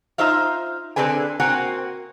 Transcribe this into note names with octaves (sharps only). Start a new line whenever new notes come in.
D#4 F4 C5 E5 F5
D3 C4 G#4 B4 G#5
A#3 C4 F#4 F#5 G#5